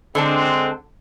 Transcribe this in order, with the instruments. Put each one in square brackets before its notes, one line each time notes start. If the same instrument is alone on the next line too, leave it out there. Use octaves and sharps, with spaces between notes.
[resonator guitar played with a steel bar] D3 D4 A5 [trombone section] G#3 C4